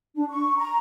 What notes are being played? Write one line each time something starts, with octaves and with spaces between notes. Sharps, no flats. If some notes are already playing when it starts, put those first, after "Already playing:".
D4
C#6
A#5